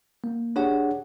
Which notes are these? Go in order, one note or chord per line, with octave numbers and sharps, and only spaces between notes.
A#3
D4 G4 G#4 C#5 F#5